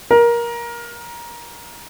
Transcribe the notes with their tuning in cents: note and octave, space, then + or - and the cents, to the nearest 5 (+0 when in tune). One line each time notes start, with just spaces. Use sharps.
A#4 +20